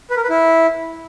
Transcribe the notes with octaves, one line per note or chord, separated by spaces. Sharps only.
B4
A#4
B4
E4